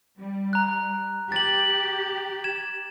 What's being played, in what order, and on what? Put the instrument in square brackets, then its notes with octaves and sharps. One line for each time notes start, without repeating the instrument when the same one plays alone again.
[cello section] G3
[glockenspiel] A#5 F#6
[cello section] G4 [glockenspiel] A6 F#7
[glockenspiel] G#6 E7